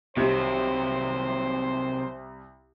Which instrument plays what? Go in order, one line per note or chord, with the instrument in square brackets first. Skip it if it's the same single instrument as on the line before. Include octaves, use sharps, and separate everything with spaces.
[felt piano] C2 [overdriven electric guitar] C3 F#3 [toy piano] D#4 G4 D#5 [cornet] C5